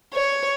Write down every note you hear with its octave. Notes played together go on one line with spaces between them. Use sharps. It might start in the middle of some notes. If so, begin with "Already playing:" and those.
C#5